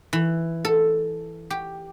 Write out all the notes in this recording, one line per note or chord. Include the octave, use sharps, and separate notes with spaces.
E3
A4
G4